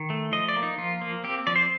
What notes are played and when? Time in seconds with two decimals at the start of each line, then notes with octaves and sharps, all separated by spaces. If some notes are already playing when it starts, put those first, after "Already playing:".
Already playing: D#3
0.10 A3
0.32 F3 D#5
0.48 D5
0.56 A#3
0.63 D#4
0.78 F3 F4
1.02 A#3
1.24 C4 G4
1.47 F3 D5
1.56 C5